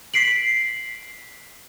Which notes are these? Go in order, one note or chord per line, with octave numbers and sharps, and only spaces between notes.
B6 C7 D7 F#7